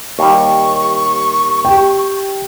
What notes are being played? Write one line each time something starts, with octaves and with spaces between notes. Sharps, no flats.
D#2 G3 C#6
G4 G5